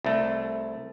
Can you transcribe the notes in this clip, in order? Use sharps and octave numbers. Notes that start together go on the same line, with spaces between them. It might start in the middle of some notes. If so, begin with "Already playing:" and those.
C2 A3